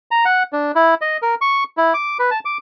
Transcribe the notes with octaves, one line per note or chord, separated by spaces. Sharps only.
A#5
F#5
D4
E4
D#5
A#4
C#6
E4
D6
B4
A5
D6